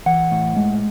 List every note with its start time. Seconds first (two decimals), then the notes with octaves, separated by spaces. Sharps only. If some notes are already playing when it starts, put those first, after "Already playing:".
0.06 E3 F#5
0.31 A2
0.56 G#3